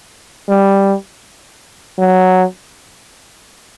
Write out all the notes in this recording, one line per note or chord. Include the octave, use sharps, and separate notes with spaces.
G3
F#3